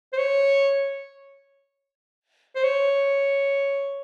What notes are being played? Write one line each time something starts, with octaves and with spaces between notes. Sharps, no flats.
C5
C#5
C5
C#5